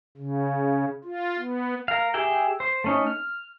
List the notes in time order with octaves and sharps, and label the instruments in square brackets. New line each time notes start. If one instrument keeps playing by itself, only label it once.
[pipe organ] C#3
F4
B3
[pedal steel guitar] A#4 F5
G4 G#4 E5 G5
C5
A3 C#4 D#4
F6